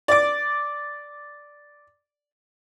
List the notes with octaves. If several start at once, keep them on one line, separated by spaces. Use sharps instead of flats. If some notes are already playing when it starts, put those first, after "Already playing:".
D5 D6